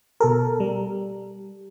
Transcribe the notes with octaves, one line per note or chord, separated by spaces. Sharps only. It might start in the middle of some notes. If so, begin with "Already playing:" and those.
B2 A4 A#4
G3